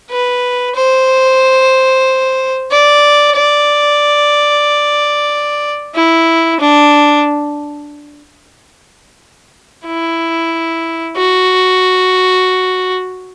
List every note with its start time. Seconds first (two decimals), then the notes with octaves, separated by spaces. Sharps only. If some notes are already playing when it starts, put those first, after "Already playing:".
0.10 B4
0.76 C5
2.71 D5
3.36 D5
5.95 E4
6.60 D4
9.86 E4
11.17 F#4